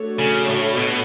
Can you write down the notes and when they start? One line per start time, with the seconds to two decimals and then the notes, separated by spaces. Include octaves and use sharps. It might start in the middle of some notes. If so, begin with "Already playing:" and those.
Already playing: A3 D4 F#4 A4 C#5
0.19 C#3
0.48 A2
0.76 B2